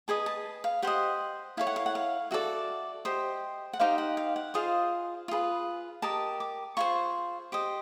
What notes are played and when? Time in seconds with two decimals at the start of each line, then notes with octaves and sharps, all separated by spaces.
0.08 G#4 B4 D#5 A5
0.26 A5
0.64 F5
0.82 G4 C5 D#5 F#5
1.57 E4 A4 C#5 F5
1.67 F#5
1.76 F5
1.86 F#5
1.95 F5
2.31 F#4 A4 D5 E5
3.05 G4 C5 D#5
3.73 F#5
3.80 D#4 G4 C5 D#5 F5
3.98 F#5
4.17 F5
4.36 F#5
4.54 F4 G#4 C5 D#5 F5
5.28 F4 G#4 B4
6.02 G4 A#4 D#5 A5
6.40 D6
6.77 F4 G#4 C5 C#6
7.52 G4 C5 D#5